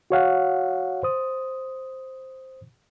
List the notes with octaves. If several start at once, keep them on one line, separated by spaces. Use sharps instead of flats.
F#4 C#5 F5 F#5
C5 D#6